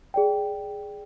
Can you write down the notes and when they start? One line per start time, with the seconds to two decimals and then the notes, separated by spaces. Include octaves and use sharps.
0.14 G#4 D5 G5